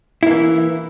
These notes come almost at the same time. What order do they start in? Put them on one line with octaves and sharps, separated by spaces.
E4 A#3 E3